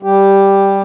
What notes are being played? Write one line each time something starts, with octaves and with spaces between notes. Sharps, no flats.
G3 G4